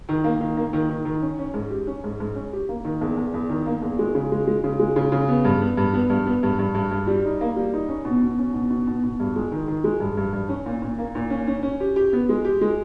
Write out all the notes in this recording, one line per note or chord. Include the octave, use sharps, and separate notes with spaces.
D#3
A#3
D#3
A#3
D#3
D#3
D#3
C#4
C#4
G#2
G4
C#4
G#2
G#2
C#4
G4
A#3
D#3
E2
E2
E2
D#3
A#3
E2
G#3
C#3
G#3
G#3
C#3
G#3
C#3
C#3
B3
G2
B3
G2
B3
G2
B3
G2
G2
G2
G2
G3
D#4
A#3
G3
D#4
C#4
B2
B2
C#4
B2
B2
B2
B2
G2
G#3
D#3
D#3
G#3
G2
G2
G2
C#4
A#2
A#2
A#3
A#2
C#4
C#4
C#4
G4
G4
B3
G#3
G4
G#3